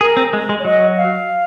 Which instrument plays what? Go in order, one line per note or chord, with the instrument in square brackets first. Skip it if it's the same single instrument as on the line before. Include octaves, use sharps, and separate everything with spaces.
[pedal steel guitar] G#4 [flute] A#4
[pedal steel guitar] C4
G#3
G#3
[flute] C#5
[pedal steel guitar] F#3 [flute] D#5
[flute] F5